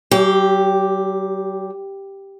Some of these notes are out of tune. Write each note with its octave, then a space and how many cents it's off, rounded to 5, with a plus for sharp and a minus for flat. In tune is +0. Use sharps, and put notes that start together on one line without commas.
F#3 +45 G4 +0